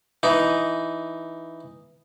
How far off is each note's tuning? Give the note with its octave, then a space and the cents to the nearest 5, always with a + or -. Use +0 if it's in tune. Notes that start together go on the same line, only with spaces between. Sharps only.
E3 +0 D#4 +0